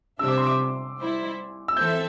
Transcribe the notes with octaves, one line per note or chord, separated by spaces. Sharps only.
C3 G3 D4 C5 E5 E6
D6
C6
D6
G3 E4 C5
E6
E3 C4 A4 E5 G6